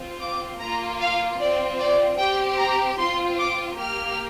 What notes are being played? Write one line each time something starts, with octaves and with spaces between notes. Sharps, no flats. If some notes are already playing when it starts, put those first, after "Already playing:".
Already playing: C4 F4
D6
A#3 F4 A#5
F5
C4 F4 D5
D5
C4 G4 G5
A#5
C4 F4 C6
D6
A#3 G4 F6